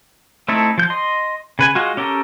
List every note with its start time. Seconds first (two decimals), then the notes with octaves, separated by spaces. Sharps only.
0.48 A3 C4 D#4 E4 A4
0.78 F3 G6
0.90 D#5 C6
1.59 C#3 B4 G#5
1.75 G#3 F4 F#4
1.97 C#4 G4 A4 A#4